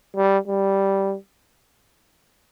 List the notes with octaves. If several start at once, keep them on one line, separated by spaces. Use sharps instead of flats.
G3
G3